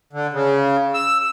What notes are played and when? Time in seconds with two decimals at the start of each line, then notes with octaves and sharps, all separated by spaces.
0.13 D3
0.33 C#3
0.94 E6